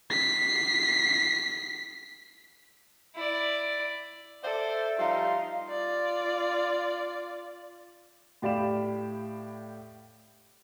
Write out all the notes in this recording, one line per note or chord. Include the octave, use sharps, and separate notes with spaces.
B6 C7
E4 D5
A4 C5 D5 E5
F3 G3 D#4 F5 C6
F4 D5
A2 G4 D5 F5 B5 E7